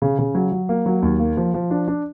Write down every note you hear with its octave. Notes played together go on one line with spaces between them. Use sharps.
C#3
C#3
F#3
F#3
A#3
F#3
D#2
A#3
F3
F3
D4
D4